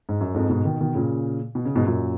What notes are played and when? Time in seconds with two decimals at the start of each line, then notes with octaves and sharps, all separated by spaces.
0.09 G#2
0.21 F#2
0.34 F2 G#2
0.50 G#2 B2
0.65 B2 D#3
0.80 B2 D#3
0.95 A#2 C#3
1.55 B2
1.65 C#3
1.76 G#2 B2
1.86 F#2 A#2